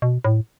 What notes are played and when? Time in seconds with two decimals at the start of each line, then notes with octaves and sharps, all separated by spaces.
0.02 B2
0.25 A2